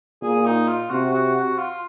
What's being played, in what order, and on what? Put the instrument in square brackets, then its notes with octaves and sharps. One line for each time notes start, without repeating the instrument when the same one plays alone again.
[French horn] A#2 [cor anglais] G#4
[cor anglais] D#4
F4
[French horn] C3 [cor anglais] F#4
[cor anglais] F#4
F#4
F4